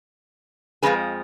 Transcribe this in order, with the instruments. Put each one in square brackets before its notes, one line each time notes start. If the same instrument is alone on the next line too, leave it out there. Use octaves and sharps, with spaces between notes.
[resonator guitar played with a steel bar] F2 F3 G#3 C#4 G#4 B4